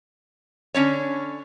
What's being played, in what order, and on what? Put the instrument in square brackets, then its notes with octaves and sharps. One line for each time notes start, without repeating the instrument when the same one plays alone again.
[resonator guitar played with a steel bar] D3 C#4 D4 C#5